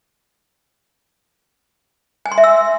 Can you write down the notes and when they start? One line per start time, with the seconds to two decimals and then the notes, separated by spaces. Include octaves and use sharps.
2.26 G#5
2.32 C6
2.38 E5
2.44 E6